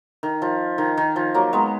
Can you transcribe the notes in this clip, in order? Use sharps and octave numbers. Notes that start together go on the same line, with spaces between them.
D#3
F3
D#3
D#3
F3
F#3 A#3
G#3 B3